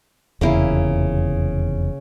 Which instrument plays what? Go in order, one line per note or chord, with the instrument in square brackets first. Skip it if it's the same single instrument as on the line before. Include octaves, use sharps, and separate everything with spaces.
[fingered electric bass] F1 E2 [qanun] C#3 A#3 E4